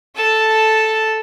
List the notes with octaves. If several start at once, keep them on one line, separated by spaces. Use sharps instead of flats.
A4 A5